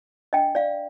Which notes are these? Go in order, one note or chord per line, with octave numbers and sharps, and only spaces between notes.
D4 D#5 G5
D5 F5